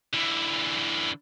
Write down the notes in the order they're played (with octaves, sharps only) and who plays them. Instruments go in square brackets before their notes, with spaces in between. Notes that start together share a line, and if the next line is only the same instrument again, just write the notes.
[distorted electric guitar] D3 E3